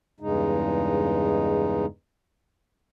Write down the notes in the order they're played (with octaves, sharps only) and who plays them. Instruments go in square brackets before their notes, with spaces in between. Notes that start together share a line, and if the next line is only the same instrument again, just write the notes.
[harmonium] E2 G2 C#3 G#3 D#4